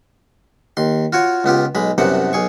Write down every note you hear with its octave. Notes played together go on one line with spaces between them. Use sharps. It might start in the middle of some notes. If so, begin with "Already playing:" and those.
D#2 C6
F4 F#4 C#5
C#2 B3 F4 G4
B1 G#3 B5
C2 F#2 C3 B3 C5 F#5
B1 G#4 C#6